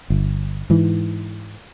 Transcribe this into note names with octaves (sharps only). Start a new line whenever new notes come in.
G1
G#2 E3